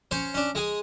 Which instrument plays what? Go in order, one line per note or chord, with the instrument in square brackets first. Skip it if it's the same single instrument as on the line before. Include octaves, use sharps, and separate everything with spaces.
[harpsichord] C#4 C5 C#5
C#4 D4
G#3 G#4 G#5